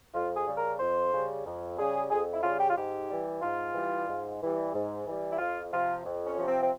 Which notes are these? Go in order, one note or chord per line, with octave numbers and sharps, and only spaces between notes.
F2 F4
G#4
C#3 G3
A#4
F2 C5
C#3 G3
F2
C#3 G3 G#4
F2 G#4
E4
C#3 F4
G3
G4
F4
G#2 G4
E3 G3
G#2 F4
E3 G3
G#2
E3 G3
G#2
E3 G3
E4
F2 F4
C3 F3 F4
F2
C#4
C3 F3
C4
C4